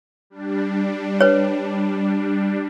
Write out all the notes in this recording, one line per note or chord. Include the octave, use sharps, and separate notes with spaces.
G3 D4
B4 C#5